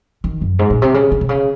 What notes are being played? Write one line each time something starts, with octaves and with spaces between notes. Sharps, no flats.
D#3
F#2
G#2
A#2
C3
C#3
C#3
C3
C#3